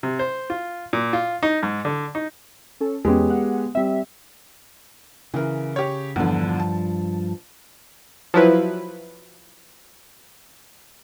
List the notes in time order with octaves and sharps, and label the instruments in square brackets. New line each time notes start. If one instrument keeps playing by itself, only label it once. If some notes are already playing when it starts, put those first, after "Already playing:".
[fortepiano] C3
C5
F4
A#2
F4
D#4
G#2
D3
D#4
[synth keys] C#4 A4
[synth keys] E2 C#4 [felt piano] G#3 B3 G4
[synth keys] F#5
[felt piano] G3 C4 [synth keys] E5
[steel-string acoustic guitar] C#3 [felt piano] E3 A#4
[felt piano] G4 C#5
[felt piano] E2 D3 [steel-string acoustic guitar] G2 F3
[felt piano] A5
[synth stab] F3 F#3 E4 B4